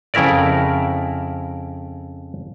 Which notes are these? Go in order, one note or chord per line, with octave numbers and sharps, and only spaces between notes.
F2 C#3 E4 A#4 D5